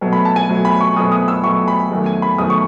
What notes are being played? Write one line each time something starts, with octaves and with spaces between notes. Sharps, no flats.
B2 F#3 A3
B5
A5
G#5
B2 F#3 A3
B5
C#6
B2 F#3 A3 D#6
D#6
E6
B2 F#3 A3 C#6
B5
E2 D#3 F#3 A3
G#5
B5
E2 D#3 F#3 A3 D#6
C#6